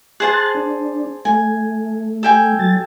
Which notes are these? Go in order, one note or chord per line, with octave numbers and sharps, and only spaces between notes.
G#4 C5 A5 C6 F#6 A6
D4
A3 G#5
A4 G5 G#5
F#3 A6